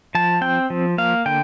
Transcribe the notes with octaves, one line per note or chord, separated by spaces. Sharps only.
F3 A5
C4 G5
F3
A#3 F5
D3 G5